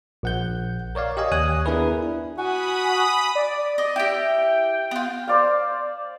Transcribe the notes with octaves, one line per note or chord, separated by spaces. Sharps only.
A#1 F#5 G6
A#4 C#5 D5 F5
G4 C#5 D#5 F5 G#5
D#2 G#5 D#6 F#6
B3 D4 E4 G#4 A#4 B4
E4
F#4 G#5 B5 D#6
D5
D#5
E4 G4 G5
B3 F4
C5 D5 F5